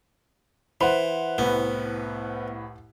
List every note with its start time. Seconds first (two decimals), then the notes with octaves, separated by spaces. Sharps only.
0.81 E3 C5 F#5 B5
1.38 C2 A2 B3 B4